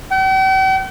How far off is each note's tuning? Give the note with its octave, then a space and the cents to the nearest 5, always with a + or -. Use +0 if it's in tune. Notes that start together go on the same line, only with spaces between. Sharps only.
G5 -45